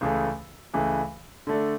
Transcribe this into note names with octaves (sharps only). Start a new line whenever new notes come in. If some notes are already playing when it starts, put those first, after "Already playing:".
C#2 C#3 E3 A3
C#2 C#3 E3 A3
D3 A3 D4